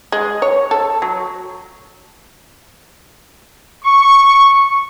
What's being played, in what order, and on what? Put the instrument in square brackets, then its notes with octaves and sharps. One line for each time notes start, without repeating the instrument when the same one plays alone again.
[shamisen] G#3
C#5
A4
F#3
[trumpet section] C#6